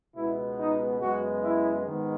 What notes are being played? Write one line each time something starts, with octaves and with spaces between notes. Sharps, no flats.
C#2 B2 G#3 B3 E4
D#4
F#2 C#3 G#3 B3 F#4
E4
G#2 D#3 G#3 B3